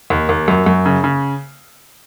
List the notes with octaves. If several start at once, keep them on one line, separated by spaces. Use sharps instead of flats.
D#2
D#2
F#2
F#2
C#3
C#3